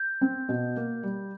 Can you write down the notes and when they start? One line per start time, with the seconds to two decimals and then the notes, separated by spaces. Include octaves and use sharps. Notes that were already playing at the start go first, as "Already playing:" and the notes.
Already playing: G6
0.21 C4
0.49 B2
0.76 A#3
1.03 G3